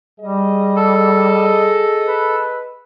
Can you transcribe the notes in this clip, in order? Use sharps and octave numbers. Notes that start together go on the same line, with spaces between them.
G3 G#4 D#5
A4
B4